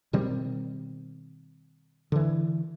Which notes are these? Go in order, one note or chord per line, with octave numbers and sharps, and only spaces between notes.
B2 D#3 G3 C4
D3 E3